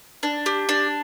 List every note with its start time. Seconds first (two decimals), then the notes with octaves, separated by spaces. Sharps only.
0.23 D4
0.46 G4
0.69 D4